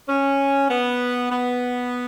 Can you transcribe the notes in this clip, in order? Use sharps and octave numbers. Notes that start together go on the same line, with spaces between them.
C#4
B3
B3